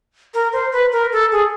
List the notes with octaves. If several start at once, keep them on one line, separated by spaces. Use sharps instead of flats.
A#4
C5
B4
A#4
A4
G#4